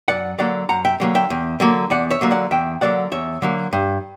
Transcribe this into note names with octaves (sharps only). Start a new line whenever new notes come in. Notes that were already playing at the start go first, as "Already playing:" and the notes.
F#2 D5 F#5
D3 F#3 A#3 D5 F#5
F#2 F#5 A#5
E5 G5
D3 F#3 A#3
E5 G5
E2
D3 F#3 A#3
E2 D5 F#5
C#5 E5
D3 F#3 A#3
D5 F#5
E2 E5 G5
D3 F#3 A#3 D5 F#5
E2 C#5 E5
D3 F#3 A#3
G2